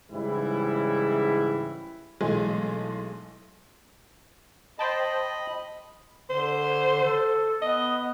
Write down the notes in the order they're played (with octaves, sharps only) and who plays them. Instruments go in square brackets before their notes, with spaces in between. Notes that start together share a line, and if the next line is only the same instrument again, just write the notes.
[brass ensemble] G#2 C#3 E3 G3 C#4 E4
[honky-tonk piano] B1 E3 G#3 A3 G#5 C6
[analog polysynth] C5 G5 A5 [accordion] D#5 B5
[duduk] D3 [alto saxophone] C5
[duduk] A4
[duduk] B3 [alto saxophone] D#5